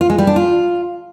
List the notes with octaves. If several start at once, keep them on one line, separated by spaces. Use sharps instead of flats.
F4
G#3
G3
D4
F4